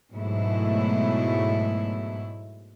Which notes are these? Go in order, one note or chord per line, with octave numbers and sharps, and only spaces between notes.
G#2 B2 F#3 A3 E4